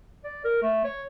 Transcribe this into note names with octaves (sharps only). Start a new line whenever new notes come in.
D5
A#4
A3
C#5